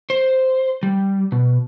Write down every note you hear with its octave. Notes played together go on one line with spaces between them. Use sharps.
C5
G3
B2